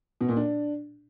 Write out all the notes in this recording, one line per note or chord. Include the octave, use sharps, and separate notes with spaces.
B2
A#2
D4